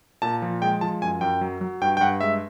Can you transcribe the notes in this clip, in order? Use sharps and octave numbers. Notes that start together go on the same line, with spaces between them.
A#2 A5
F3
G#3 G5
F3 A5
F#2 G#5
F#2 G5
F#3
F#3
G2 G5
G5
G2 F#5
G#3 E5